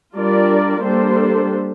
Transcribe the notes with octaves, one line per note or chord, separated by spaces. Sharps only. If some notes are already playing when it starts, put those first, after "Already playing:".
G3 D4 F4 A#4 D5
G3 A#3 D4 A4 C5